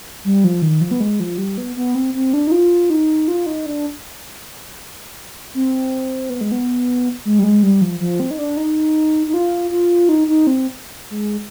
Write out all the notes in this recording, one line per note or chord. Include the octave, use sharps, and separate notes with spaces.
G3
F3
D#3
F3
B3
G#3
F3
G3
B3
B3
C4
C4
D4
D#4
F4
D#4
F4
D#4
D4
C4
B3
G#3
B3
G#3
G3
G#3
G3
F3
F3
C4
D#4
D4
D#4
D#4
F4
F4
D#4
D#4
C4
G#3